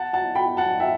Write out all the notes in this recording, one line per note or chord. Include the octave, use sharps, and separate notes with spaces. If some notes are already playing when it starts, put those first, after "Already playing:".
Already playing: F#5 A5
F#5 A5
G5 B5
F#5 A5
E5 G5